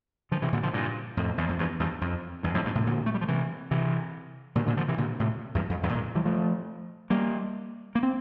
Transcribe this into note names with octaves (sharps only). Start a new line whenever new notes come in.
D3 F3
C3 E3
A#2 D3
D3 F3
G2 A#2
F2 A2
E2
F2
E2 G2
E2 G2
F2
E2 G2
F2 A2
G2 A#2
A2 C3
A#2 D3
A3
G3
F3
C3 E3
C3 E3
A#2 D3
A#2 D3
D3 F3
C3 E3
A#2 D3
A2 C3
E2 G2
F2
E2 G2
G2 A#2
E3 G3
F3 A3
G3 A#3
A#3
C4